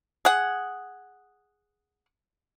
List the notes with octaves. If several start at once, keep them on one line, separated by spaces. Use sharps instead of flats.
G#4 F#5